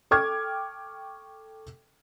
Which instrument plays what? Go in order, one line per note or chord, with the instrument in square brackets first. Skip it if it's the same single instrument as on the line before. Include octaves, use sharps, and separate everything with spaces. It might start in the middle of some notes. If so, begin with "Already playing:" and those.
[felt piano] A4 G5 C#6 D6 F6 G#6